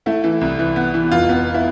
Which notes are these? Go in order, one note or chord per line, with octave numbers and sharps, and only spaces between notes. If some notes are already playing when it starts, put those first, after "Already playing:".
A3 E4
E3
C2
E3
B3
E3
F1 F4
B3
E4